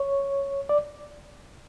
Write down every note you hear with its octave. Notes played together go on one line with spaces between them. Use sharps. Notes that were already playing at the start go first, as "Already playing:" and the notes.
Already playing: C#5
D5